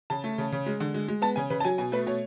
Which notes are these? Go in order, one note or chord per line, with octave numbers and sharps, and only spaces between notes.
C#3 A5
A3
C#3
C#3
G#3
D3
G#3
G#3
B3 A5
C#3 G#5
C#3 B4
A5
F#3 G#5
B2 G#5
A3 B4
B2 C#5